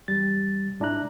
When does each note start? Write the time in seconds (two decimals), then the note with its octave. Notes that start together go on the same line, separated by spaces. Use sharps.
0.08 E2 G3 A6
0.80 G#2 D4 E4 A#5 F#6